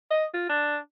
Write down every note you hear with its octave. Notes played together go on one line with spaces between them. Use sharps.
D#5
F4
D4